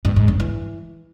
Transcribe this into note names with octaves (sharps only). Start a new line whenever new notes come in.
G2
G#2
G2
E3